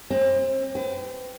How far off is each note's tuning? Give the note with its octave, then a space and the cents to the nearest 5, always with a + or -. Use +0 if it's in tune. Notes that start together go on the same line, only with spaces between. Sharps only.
C4 +35 C5 -10
B4 +45 G5 +0